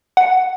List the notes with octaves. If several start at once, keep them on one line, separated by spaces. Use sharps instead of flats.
F#5